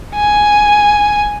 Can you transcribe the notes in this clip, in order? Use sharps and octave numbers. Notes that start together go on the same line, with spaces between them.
G#5